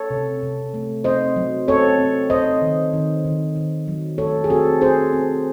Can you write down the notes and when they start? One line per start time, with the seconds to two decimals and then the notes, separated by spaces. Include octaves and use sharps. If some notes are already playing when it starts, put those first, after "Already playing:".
Already playing: A4 C#5
0.10 C3
0.42 C3
0.74 A3
1.04 C4 C5 D#5
1.36 F#3
1.68 C4 A4 C#5
1.99 C4
2.30 C4 C5 D#5
2.62 D#3
2.93 D#3
3.25 D#3
3.56 D#3
3.88 F#3
4.18 A3 A4 C#5
4.44 G#4
4.50 C4 F#4 A4
4.81 C4 G#4 C5
5.13 C4